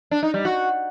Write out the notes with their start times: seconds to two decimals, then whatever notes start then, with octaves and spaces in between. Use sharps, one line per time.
0.11 D4
0.23 D#4
0.34 G3
0.45 F#4